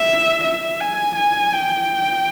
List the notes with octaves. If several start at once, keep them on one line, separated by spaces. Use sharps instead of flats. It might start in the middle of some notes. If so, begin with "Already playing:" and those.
Already playing: E5
E5
G#5
G#5
G5